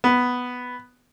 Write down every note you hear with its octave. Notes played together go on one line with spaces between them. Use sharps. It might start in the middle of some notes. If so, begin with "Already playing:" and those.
B3